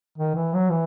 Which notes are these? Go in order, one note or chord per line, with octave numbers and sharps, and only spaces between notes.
D#3
E3
F#3
E3